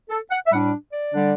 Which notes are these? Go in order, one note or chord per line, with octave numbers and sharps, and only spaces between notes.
A4
F#5
E5
A2 G3 D4 F#5
D5
D3 G3 D4